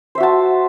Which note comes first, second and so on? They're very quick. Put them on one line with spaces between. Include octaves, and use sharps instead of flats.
C5 E5 F#4 A5